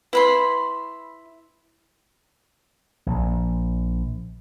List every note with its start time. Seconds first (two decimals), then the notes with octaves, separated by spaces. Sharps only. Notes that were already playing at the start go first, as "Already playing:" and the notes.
0.13 E4 B4 B5 C6
3.06 A#1